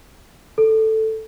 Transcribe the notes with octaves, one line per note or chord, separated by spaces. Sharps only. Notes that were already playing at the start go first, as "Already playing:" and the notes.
A4